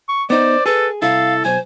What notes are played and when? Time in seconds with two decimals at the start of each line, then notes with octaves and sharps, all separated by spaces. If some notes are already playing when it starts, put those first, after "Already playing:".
0.08 C#6
0.30 B3 D#4 C5 D5
0.66 G#4 A4 B4
1.02 C2 E4 A4 F5
1.45 B1 C5 G#5